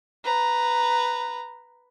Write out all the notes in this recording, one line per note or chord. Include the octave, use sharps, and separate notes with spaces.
B4 A#5